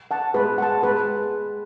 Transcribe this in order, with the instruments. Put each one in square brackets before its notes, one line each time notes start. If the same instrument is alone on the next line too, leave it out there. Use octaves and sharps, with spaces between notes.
[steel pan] F#5 A5
[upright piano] G#3 [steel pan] B4
[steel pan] F#5 A5
[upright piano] G#3 [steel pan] B4